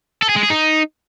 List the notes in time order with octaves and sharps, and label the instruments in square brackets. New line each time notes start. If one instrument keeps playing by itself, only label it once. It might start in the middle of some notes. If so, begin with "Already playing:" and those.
[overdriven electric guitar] A4
G#4
G#3
G#4
D#4